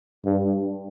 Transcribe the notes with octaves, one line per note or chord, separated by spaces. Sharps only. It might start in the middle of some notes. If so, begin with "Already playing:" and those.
G2